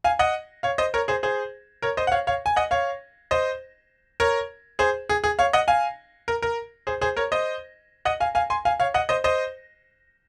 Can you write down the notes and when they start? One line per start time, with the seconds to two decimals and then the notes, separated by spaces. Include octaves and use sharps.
0.04 F5 G#5
0.19 D#5 F#5
0.63 C#5 F5
0.78 C5 D#5
0.94 A#4 C#5
1.08 G#4 C5
1.23 G#4 C5
1.82 A#4 C#5
1.97 C5 D#5
2.07 F#5
2.12 C#5 F5
2.27 C#5 F5
2.46 G#5
2.56 D#5 F#5
2.71 C#5 F5
3.31 C5 D#5
4.20 A#4 C#5
4.79 G#4 C5
5.09 G#4
5.24 G#4
5.39 C#5 F5
5.53 D#5 F#5
5.68 F5 G#5
6.28 A#4
6.42 A#4
6.87 G#4 C5
7.01 G#4 C5
7.17 A#4 C#5
7.32 C5 D#5
8.05 D#5 F#5
8.20 F5 G#5
8.35 F5 G#5
8.50 G#5 C6
8.65 F5 G#5
8.80 C#5 F5
8.94 D#5 F#5
9.09 C5 D#5
9.24 C5 D#5